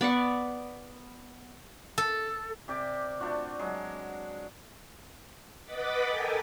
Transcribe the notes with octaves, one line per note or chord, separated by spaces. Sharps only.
B3 D5 F#5 C#6
A4
C3 G4 D5 D6
A3 D4 F4 F#4
F#3 G#3
B4 D#5 F#5 D6 A6 B6
A4 A#4 G5 G#5